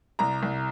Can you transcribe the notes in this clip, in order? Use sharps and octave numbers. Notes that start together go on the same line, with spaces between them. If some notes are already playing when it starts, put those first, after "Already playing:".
C2 A#5
C2